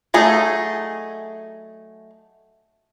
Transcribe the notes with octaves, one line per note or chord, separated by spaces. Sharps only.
F#3 A3 D#4 G#4